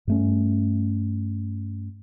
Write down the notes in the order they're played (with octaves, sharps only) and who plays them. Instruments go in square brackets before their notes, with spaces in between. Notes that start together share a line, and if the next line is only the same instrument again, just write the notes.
[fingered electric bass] G2 A3 C#4